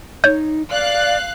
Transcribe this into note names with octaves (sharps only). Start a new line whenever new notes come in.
D#4 C#5 G6
D5 F5 F#6